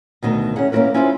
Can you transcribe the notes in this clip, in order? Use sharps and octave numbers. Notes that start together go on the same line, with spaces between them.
D2 B2 D#3 D#4
C#4 E4 G#4 F#5
A#3 C#4 E4 F#4 A#4 B4
C#4 E4 F4 G#4 C5